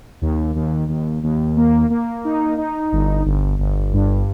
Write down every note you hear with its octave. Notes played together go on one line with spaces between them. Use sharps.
D#2
D#2
D#2
D#2
A#3
A#3
D#4
D#4
G1
G1
G1
G2